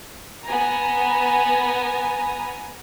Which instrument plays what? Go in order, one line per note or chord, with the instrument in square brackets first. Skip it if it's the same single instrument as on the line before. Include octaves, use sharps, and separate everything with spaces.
[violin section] B3 G#5 A#5